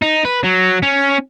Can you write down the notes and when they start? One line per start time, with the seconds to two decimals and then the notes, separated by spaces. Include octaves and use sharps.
0.02 D#4
0.25 B4
0.44 F#3
0.83 C#4